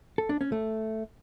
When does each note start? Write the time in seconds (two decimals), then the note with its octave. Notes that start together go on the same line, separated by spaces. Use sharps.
0.18 A4
0.29 D4
0.41 C#4
0.52 A3